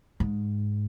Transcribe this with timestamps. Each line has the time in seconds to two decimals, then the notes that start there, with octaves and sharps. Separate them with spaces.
0.20 G#2